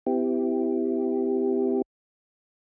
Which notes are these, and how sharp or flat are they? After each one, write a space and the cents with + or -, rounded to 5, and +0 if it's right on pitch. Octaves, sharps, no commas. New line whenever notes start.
B3 +45 E4 +0 G4 +0